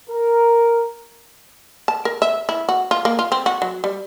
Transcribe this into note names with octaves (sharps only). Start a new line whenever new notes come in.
A#4
A5
A#4
E5
E4
F#4
F4
A#3
F4
C4
F#4
F#3
G3